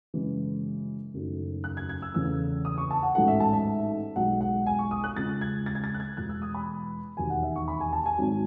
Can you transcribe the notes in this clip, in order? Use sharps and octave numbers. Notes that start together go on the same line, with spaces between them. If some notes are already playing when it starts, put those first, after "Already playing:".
F#2 C#3 E3 G#3
F#1 F#2 D#3 F#3 A3
F#6
G#6
G#6
E6
E2 C#3 E3 A3 E6
D#6
C#6
A5
F#5
A1 G#2 F#3 A3 F#5
E5
A5
E5
B1 B2 G#3 F#5
F#5
G#5
C#6
D#6
F#6
C#2 C#3 G#3 A6
G#6
A6
G#6
A6
F#6
G#6
E1 E2 B2 G#3 F#6
E6
D#6
B5
E1 D#2 D#3 F#3 G#5
F#5
E5
C#6
B5
G#5
A5
G#5
G#1 G#2 F#3